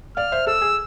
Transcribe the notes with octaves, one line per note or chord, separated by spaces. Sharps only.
D5 F5 F6
C5 E5
A4 E6
G#4